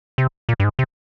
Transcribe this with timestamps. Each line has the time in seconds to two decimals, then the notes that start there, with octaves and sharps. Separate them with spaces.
0.18 C3
0.49 A#2
0.60 G2
0.64 G#2
0.79 C3